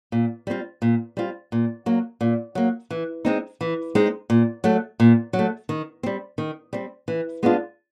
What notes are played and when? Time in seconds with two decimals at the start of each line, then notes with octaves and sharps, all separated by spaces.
0.12 A#2
0.47 G3 C4 F4
0.82 A#2
1.17 G3 C4 F4
1.52 A#2
1.86 F#3 A#3
2.21 A#2
2.55 F#3 A#3
2.90 E3
3.25 G#3 C4 D#4
3.61 E3
3.95 G#3 C4 D#4
4.30 A#2
4.64 F#3 A3
5.00 A#2
5.33 F#3
5.39 A3
5.69 D#3
6.03 G3 C4
6.38 D#3
6.73 G3 C4
7.08 E3
7.43 G#3 B3 D4 F4